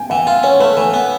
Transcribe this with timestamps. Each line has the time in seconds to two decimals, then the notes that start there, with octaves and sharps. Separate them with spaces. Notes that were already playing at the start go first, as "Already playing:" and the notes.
Already playing: G5 G#5
0.10 E3 F#5
0.27 F4 F5
0.43 C#4 C#5
0.60 A3 B4
0.77 E3 B4
0.94 B3